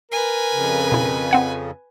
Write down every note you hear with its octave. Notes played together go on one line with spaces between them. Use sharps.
A#4 B4 G#5
F2 C#3
B2 E4
C4 F#5 G#6